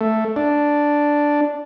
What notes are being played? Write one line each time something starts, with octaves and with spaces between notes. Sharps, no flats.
A3
D4